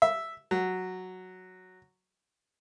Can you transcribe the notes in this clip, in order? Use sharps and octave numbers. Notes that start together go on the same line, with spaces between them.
E5
F#3